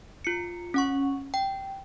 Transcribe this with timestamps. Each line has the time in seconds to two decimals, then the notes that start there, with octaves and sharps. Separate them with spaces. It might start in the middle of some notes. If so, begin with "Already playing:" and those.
0.25 F4 C#7
0.74 C#4 F#5 C#6
1.34 G5